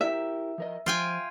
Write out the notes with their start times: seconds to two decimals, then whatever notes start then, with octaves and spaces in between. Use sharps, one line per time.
0.01 E4 G4 A#4 E5
0.58 F3 A#4 D#5
0.86 F3 F4 G5 G#5